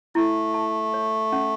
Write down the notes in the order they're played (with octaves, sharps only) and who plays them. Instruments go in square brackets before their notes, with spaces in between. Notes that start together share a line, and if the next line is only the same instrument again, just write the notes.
[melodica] A3 [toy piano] E4
[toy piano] A5
C#5
C#4